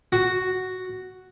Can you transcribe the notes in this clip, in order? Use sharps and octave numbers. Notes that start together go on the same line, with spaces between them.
F#4